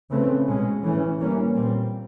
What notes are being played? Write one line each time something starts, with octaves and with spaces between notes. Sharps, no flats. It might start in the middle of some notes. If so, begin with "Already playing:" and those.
C#3 E3 A3 C4
B2 G#3 C#4
A2 E3 A3 C#4
E3 G3 A#3 C#4
A#2 G3 C4